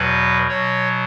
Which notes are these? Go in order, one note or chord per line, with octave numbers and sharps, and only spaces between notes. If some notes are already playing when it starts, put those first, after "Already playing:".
Already playing: E2 B2 F#3 B4
B2 F#3 C#5